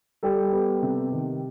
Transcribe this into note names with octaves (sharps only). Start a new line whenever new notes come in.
G3 G4 A4
B3
C3
D#3